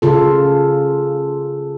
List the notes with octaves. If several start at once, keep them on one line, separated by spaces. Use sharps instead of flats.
C#3 F4 A4